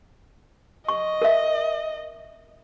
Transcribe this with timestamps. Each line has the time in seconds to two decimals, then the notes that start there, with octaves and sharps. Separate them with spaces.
0.88 D#5 C#6
1.22 A#4 E5